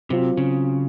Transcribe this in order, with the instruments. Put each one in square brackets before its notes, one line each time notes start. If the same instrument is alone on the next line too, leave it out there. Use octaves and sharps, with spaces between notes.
[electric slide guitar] C3 [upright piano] F#3 C4 F4
[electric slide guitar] C#3